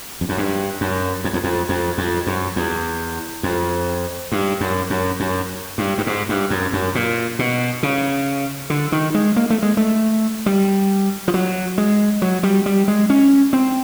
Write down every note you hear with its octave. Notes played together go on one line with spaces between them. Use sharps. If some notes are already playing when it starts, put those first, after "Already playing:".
F2
F#2
G2
F#2
F2
E2
F2
F2
F2
F#2
E2
F2
G2
F#2
F#2
F#2
G2
G2
G#2
G2
F#2
F#2
A#2
B2
C#3
D3
D#3
G#3
A#3
A3
G#3
A3
G3
F3
F#3
G#3
F#3
G3
G3
G#3
C#4
C4